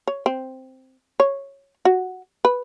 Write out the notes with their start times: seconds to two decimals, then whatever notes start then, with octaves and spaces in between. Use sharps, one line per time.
0.07 C#5
0.26 C4
1.20 C#5
1.85 F#4
2.45 B4